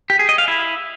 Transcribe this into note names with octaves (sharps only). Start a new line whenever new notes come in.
G4
G#4
D#5
F5
E4